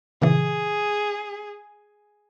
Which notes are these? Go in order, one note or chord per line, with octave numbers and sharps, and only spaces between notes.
A#2 C#3 E3 G#4